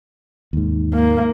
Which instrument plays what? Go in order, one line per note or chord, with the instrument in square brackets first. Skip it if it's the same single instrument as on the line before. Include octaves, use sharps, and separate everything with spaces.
[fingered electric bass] D#2 G#2
[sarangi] A#3